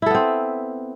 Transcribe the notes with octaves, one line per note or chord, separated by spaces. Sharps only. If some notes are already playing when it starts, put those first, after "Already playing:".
B3 C4 E4 A4